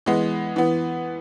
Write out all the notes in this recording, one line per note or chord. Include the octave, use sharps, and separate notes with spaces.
E3 G#3 B3
E3 B3